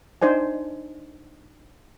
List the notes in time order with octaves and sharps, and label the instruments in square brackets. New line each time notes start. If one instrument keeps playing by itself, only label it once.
[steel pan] D4 D#4 C5 D5 G#5